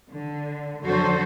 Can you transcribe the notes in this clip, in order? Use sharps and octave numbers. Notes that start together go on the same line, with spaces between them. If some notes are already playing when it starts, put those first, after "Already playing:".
D3
F2 D3 F#3 F#4 A4 C5